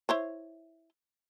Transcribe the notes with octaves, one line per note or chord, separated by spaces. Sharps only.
E4 C5 C#5